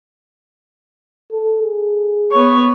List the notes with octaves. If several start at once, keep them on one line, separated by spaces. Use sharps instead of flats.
A4
G#4
B3 C#5